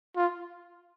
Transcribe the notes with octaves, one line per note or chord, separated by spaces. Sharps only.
F4